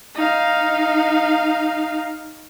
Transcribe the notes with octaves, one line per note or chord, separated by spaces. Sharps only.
D#4 F5